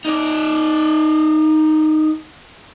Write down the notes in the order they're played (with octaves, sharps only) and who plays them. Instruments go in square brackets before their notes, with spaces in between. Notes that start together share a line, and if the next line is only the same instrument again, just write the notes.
[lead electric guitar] D#4 D5